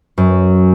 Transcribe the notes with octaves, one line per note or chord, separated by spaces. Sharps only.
F#2